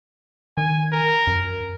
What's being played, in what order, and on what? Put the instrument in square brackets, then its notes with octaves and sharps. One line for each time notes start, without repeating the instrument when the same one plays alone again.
[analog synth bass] D#3 [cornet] G#5
[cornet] A#4
[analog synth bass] F#2